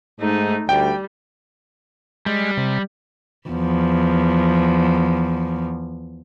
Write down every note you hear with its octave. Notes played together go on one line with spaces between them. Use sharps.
G#2 A3 D#4
D2 G3 G5
G3 G#3
C3
E2 F3